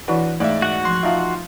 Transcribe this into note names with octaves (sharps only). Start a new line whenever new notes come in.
E3 D4 E4 F#4 B4
G#2 A3 D5 E5 F5
F#4 F#5
F3 C6
F3 D#4 F4 E5 F5